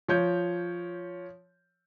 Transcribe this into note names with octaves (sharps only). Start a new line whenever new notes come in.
F3 C#5 G6